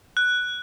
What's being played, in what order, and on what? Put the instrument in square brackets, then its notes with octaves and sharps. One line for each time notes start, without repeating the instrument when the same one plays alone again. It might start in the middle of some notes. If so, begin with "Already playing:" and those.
[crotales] F#6